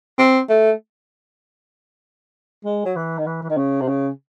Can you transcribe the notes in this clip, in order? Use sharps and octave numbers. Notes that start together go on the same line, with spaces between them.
C4
A3
G#3
F#3
E3
D#3
E3
E3
D#3
C#3
C3
C#3